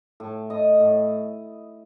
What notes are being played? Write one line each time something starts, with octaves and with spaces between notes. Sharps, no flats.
A2
A2 D#5
A2